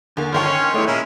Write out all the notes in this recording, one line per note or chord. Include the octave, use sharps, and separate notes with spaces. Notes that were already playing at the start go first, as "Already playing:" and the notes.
E2 D3 A#3
G1 D#3 F3 A#4 C#5 G5 C6
C#4
E2 A3 E4
A#2 G#3 C#4 E4 A#4